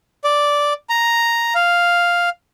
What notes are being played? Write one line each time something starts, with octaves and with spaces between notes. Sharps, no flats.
D5
A#5
F5